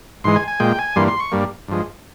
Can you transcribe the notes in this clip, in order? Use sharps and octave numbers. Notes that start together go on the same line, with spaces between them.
G#2 E3 G#3 C6
G#5
G#5
A#2 G#3 G5
G#5
G2 E3 G3 A#3 C6
C6
C#6
G2 G3 A#3
G2 F3 G#3